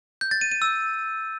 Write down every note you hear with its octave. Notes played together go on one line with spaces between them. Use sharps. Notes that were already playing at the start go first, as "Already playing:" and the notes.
G6
A6
D#7
D#7
E6